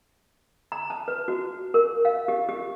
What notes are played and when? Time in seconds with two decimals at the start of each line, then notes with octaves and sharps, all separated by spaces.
0.72 A#5
0.90 A5
1.08 B4
1.28 F#4
1.74 A#4
2.05 F5
2.28 G4
2.49 G4